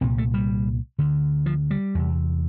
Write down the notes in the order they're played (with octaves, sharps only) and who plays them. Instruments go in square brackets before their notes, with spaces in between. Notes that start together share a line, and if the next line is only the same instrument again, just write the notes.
[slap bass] C2 A#2 C4
A3
G3
D2 D3
F3
G3
E2 C3